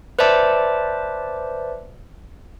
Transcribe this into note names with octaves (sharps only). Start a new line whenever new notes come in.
B4 C5 D5 E5 A5 D6